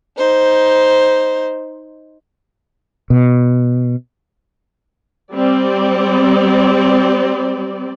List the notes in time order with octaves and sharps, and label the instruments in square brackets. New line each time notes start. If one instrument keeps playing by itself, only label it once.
[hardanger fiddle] D#4 C5
[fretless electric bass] B2
[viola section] G3 C4 D5